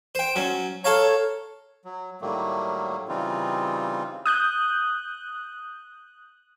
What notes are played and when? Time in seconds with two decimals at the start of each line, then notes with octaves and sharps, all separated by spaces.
0.15 C5 G5
0.36 F#3 C#4
0.84 A4 C#5 F5 A#5
1.85 F#3
2.21 A2 D#3 F#3 G3 A3 A#3
3.09 C#3 E3 G3 C4 D#4 F4
4.26 D#6 F#6 G6